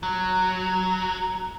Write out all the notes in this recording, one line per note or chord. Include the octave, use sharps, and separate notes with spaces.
F#3